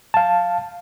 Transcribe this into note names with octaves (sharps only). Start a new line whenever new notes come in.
F5 A5